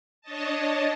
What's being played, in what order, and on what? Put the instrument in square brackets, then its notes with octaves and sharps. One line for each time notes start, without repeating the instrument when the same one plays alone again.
[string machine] D4 C#5 D#5 A5